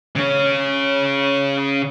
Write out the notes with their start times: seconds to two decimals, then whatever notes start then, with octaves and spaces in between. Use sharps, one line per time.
0.16 C#3 C#4